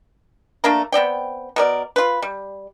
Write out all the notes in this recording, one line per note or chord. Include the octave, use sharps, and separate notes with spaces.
A3 A#3 D4 A#4
B3 C4 D5 G5
B2 A#4 D5
F4 B4
G3